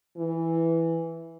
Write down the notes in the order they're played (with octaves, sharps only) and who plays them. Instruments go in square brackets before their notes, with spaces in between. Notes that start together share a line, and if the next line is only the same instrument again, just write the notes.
[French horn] E3